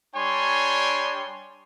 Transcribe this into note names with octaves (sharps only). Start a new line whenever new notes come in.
G3 D4 C#5 G#5 C6